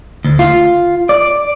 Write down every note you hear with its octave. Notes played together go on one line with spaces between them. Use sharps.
D2
F4
D5